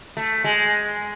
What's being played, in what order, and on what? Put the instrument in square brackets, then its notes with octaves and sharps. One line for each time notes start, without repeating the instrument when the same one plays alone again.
[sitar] A3
G#3